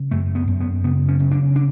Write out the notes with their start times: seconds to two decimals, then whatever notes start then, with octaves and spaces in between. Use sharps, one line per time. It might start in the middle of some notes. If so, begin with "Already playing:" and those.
Already playing: C#3
0.11 F#2 A3
0.35 B3
0.47 F#2
0.60 B3
0.83 C#3 B3
1.08 C#4
1.19 C#3
1.31 D4
1.56 D4